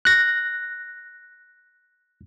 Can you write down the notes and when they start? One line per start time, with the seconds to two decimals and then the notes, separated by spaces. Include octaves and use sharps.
0.05 F#6 A#6